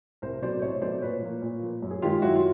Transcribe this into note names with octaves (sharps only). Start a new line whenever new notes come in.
C2 A#4 C5
B2 F#3 A3 C5 D5
C2 C#5 D#5
B2 F#3 A3 C5 D5
A#2 B4 C#5
F3 A#3
A#2
F3 A#3
F#2
G#4
D#3 G#3 F4 G4
F#2 E4 F#4
F4